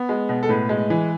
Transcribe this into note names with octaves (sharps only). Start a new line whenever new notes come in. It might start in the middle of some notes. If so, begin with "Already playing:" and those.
Already playing: B3
G#3
B2
A4
A2 B4
G#3
E3